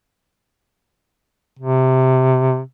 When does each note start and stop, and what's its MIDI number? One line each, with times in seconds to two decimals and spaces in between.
1.59 2.60 48